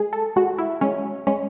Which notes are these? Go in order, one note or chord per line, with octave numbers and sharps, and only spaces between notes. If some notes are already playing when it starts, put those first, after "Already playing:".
Already playing: G#3 G#4
A4
G#3 F#4
E4
G#3 C#4
G#3 C#4